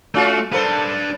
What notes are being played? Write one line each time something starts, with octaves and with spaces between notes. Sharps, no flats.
A3 C#4 F4 F#4
A#3 D4 A4 B4 C5